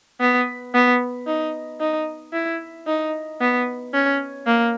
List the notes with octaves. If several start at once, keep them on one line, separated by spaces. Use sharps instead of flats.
B3
B3
D#4
D#4
E4
D#4
B3
C#4
A#3